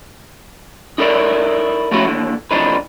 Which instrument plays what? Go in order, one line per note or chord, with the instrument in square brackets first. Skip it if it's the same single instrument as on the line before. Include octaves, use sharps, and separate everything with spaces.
[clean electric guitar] D#4 E4 A4 A#4 C5 D5
F3 A3 B3 C#4 E4 F#4
D#2 D3 E3
C3 E3 F3 D4 D#4 B4